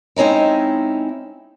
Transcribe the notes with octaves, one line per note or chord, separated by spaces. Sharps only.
G#3 C4 C#4 D#4 E4